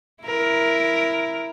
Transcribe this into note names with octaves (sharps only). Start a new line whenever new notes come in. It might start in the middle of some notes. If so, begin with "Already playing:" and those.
E4 A#4